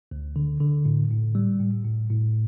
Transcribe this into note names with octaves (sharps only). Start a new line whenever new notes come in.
D2
D3
D3
A2
A2
G3
A2
A2
A2